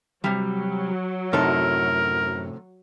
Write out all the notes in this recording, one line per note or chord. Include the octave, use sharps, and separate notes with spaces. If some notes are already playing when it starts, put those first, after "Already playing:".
C3 F#3 G3
F#2 A2 C3 D#4 A4 A#4